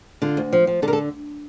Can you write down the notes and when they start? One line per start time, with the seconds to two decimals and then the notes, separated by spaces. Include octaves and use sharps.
0.22 D3 F4
0.37 D2
0.53 F3
0.67 F3
0.82 D3 A4
0.88 A#4
0.93 A4